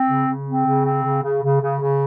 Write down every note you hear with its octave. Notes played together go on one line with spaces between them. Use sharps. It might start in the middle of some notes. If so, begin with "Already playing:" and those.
Already playing: C4
C#3
C#3
C4
C#3
C4
C#3
C#3
C#3
C#3
C#3